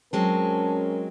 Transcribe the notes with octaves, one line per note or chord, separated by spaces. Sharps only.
F#3 G#3 C4 C#4 A#4 A5